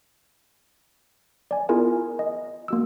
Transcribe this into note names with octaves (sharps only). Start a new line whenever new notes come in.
D5 G#5
B3 E4 F4 G#4 A#4 G#5
D#5
A#3 F#4 E6